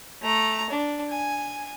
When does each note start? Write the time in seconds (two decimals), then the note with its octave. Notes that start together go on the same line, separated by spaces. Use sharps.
0.22 A3 A#5
0.70 D4
1.10 G#5